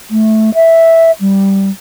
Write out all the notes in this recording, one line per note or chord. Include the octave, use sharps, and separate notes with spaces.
A3
E5
G3